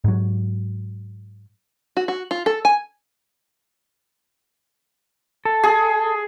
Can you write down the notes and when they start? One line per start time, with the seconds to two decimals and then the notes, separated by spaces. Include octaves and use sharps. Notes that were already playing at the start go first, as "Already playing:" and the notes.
0.04 G#2 F#3
1.97 F#4
2.08 F#4
2.31 F4
2.46 A4
2.65 G#5
5.45 A4
5.63 G#4